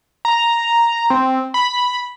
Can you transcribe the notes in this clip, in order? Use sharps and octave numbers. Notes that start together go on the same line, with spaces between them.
A#5
C4
B5